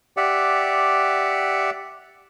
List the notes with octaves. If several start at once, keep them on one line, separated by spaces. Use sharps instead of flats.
G4 D5 E5 F#5